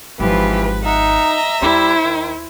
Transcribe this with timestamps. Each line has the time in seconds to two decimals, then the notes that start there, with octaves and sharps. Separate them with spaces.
0.20 G#1 E3 F3 G4 B4
0.85 D#4 E5 F#5 A#5
1.31 D#5
1.62 D#2 G3 E4 C5
2.04 D#3